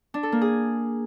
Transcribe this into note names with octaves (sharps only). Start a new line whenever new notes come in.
D4
A4
A#3
G#4